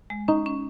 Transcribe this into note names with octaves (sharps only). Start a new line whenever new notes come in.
G#3
C#4 D#4
C#4